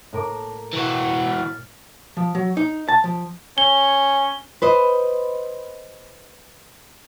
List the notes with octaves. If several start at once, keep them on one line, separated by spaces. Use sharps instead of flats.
A2 A#4 D6
E3 F#4
F6 A6 B6
F3
F#3
D#4
A5
F3
C#4 G7
B4 C5 D#5